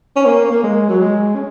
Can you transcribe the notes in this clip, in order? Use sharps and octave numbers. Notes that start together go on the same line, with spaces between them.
C#4
A#3
A#3
G#3
F#3
G#3
C#4